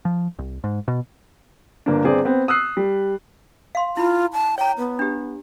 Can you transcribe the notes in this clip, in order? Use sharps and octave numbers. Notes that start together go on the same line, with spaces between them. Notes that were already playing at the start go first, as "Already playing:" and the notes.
F3
C2
G#2
B2
G1 A#3 D4
G1 C4 G#4 D5
B3 C4
D#6 E6 F#6 C7
G3
F5 C6
E4 F4 B5
A5
C#5 G5 A#5
B3
D4 G4